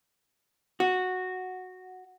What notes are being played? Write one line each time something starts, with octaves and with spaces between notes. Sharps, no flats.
F#4